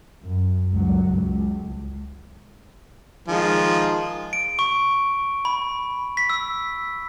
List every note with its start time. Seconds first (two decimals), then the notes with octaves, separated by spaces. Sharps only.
0.23 F#2
0.72 C#2 F#3
1.07 C#2
3.28 D#3 F3 G#3
4.33 D7
4.59 C#6
5.45 B5
6.17 B6
6.30 E6